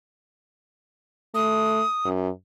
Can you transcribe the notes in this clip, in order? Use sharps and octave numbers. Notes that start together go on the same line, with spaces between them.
A3 D#6
F#2